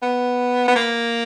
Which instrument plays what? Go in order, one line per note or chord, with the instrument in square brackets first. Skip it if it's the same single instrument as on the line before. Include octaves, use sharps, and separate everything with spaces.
[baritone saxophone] B3
B3
A#3